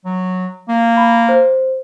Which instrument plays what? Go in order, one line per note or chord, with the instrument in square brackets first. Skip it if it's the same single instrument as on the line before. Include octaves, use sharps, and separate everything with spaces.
[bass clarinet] F#3
A#3
[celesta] B5
C5